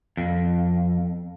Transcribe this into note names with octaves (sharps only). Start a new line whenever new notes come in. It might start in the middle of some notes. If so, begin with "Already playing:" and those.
F2